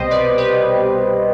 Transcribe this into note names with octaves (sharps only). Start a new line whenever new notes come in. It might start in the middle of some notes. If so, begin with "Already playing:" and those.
Already playing: C2 B2 G3 C5 D#5
B4 D5
G4 B4